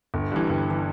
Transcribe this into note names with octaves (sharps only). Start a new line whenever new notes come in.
G1
G2 E3
G1
E3